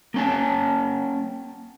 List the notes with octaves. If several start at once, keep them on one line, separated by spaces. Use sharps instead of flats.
A#3 C#4 A5